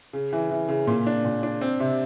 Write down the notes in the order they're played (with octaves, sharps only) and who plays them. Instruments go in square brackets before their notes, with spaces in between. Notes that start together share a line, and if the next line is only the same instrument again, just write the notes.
[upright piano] C#3
E3
E3
C#3
A#2
D4
A#2
D4
C4
C3